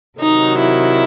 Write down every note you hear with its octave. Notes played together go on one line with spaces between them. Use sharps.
C3 D#3 F#3 D#4
E4